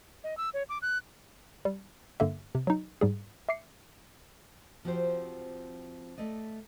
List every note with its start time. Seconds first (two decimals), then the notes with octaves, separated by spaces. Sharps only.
0.24 D#5
0.37 E6
0.54 C#5
0.69 D6
0.82 F#6
1.65 G3
2.20 G2 D3 A#3 E5
2.55 C3
2.67 F#3 D#4
3.01 G#2 G3 G#4
3.49 E5 D6 C7 C#7
4.85 F3 C4 F#4 G4 C5
6.18 A3 D5 D#5